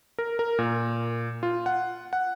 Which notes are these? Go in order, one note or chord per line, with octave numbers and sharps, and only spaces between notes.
A#4
A#4
A#2
F4
F#5
F#5